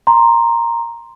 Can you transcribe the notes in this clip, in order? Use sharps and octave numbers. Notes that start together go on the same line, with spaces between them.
A#5 C6